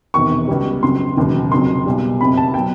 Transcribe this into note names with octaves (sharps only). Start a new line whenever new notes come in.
E1 E2 C3 D#3 C#6
C#2 B2 G3
F2 C#3 F#3 C6
E1 D#2 C#3 F#3
F1 F2 C#3 F#3 C6
B1 B2 G3
F#1 F2 C3 B5
A5
B2 F#3 G5